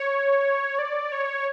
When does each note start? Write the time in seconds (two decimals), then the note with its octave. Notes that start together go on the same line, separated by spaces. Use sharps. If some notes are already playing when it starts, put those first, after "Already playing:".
Already playing: C#5
0.79 D5
1.12 C#5